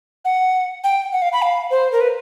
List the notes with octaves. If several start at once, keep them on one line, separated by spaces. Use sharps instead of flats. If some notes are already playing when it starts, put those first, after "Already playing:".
F#5
G5
F#5
F5
B5
F5
C5
A#4
B4